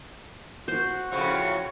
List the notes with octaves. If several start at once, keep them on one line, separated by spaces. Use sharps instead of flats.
F#4 C5
A2 C#3 F3 C#6